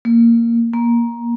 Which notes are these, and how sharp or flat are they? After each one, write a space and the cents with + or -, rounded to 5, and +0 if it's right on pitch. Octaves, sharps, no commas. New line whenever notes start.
A#3 -5
A#3 +15